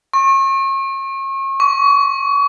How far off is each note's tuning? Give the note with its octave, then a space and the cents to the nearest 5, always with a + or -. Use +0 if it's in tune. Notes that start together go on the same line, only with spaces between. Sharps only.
C#6 -40
C#6 +35